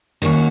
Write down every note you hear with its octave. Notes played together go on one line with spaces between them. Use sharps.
D#3 A#3 C#4 F#4